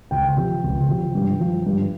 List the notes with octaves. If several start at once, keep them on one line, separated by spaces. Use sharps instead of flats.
C#2 G5
C3 F3
C#2
C3 F3
G2
F3
G2